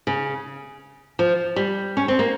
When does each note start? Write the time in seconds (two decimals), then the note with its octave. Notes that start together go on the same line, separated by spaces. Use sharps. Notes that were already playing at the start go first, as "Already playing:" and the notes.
0.07 C#3
1.19 F3
1.56 G3
1.97 C#4
2.08 C4
2.19 A#3